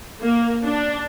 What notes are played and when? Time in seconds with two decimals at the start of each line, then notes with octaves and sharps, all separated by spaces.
0.21 A#3
0.64 D4